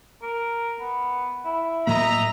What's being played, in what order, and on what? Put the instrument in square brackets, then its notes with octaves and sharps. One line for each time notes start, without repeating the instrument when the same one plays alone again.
[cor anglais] A#4
B3
E4
[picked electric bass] A2 F#3 A#3 [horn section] D#5 E5 A#5